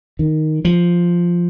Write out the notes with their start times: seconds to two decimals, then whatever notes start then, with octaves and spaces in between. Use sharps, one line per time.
0.19 D#3
0.65 F3